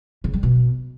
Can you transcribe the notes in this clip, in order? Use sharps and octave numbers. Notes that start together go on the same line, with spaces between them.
C#3
G3
B2